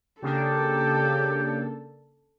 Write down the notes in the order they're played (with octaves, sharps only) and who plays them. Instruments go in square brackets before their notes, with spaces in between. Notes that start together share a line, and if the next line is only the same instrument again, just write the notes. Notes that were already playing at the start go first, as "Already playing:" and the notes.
[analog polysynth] C#3 A#3 D4 [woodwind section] G4 [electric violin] A4